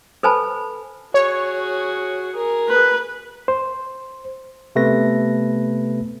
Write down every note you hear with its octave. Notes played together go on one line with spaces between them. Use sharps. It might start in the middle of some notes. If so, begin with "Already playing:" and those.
A4 B4 C5 G#5 A5 B5
F#4 G#4 C#5
G#4 A#4
B4
C5
C3 A3 B3 B4 A#6